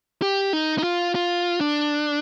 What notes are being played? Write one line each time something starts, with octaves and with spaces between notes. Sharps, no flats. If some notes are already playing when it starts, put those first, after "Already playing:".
G4
D#4
D#4
F4
F4
D4